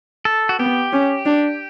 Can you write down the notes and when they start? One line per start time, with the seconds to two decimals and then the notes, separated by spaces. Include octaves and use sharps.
0.25 A4
0.49 F#4
0.59 B3 G4
0.93 C#4
1.26 D4